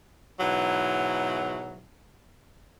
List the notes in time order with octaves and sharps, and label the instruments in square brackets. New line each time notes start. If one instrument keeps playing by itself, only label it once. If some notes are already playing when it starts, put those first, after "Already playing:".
[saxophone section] G#2 B2 E3 F#3